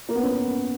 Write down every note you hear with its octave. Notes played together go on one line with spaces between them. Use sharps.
A#3
B3
C#4